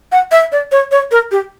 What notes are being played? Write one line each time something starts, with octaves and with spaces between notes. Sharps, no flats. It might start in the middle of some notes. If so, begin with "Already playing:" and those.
F#5
E5
D5
C#5
C#5
A#4
G4